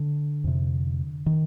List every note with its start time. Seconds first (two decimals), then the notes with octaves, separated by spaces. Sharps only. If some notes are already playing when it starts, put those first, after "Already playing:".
Already playing: D3
0.44 F2 C3
1.26 D#3